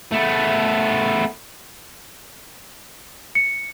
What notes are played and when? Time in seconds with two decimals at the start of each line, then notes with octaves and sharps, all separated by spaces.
0.12 A3 B3
3.35 C#7